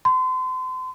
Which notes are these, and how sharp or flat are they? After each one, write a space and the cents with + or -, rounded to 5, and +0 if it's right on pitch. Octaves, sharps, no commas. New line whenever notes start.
C6 -35